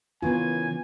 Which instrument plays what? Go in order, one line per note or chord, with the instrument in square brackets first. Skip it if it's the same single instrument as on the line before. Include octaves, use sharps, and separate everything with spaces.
[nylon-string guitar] C#3 E3 A#4 [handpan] B3 F4 [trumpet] G#5